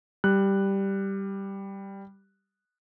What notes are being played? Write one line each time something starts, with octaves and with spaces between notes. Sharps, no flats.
G3 F#6